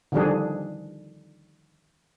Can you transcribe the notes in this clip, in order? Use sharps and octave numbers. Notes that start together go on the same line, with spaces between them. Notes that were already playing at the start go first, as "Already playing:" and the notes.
D3 D#3 F3 G3 D4 G#4